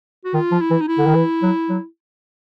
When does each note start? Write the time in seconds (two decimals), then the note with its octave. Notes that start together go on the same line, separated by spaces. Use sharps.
0.25 F#4
0.34 D#3 F4
0.51 F3
0.61 E4
0.71 E3
0.81 D#4
0.88 E4
0.98 D3
1.07 D#3
1.15 E3
1.42 F#3
1.70 F#3